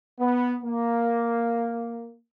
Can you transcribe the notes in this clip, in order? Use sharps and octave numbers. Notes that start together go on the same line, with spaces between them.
B3
A#3